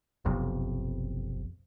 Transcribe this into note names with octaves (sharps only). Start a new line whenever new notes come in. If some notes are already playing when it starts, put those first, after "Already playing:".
F#1 B1 F2 C3